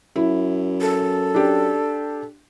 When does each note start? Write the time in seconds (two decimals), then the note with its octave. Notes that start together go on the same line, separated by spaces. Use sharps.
0.16 F#2 E4
0.81 A4
1.34 D4 G4